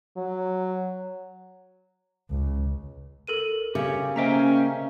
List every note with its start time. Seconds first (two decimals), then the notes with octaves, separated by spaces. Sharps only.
0.17 F#3
2.30 C#2
3.27 A4 A#4 D#7
3.75 C#3 G4
4.16 A#3 C#4 C5 D#5 E5 G5 A#5